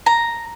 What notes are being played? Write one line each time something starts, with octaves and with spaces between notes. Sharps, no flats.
A#5